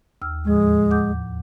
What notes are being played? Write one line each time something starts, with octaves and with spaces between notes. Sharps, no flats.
D#2 E6 F6
E2 A2 F3 G#3
F#5 D6 G6